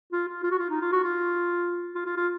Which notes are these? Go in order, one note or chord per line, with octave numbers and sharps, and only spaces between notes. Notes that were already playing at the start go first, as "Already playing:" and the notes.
F4
F4
F4
F#4
F4
D#4
F4
F#4
F4
F4
F4
F4